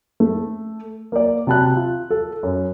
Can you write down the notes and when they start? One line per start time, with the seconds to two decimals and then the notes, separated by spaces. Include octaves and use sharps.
0.20 A3
1.12 A#3 D5
1.47 C3 F#4 A5 B5 F#6
1.76 F4
2.11 A4
2.43 F#2